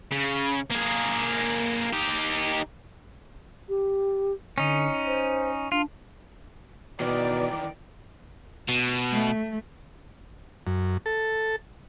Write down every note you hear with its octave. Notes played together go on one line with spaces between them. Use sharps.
C#3
A#3 G#4
D#4 G4
G4
D3 C#4 D#4
C5
D4 F4
B2 D#3 E3 D5
B2
A3
F#2
A4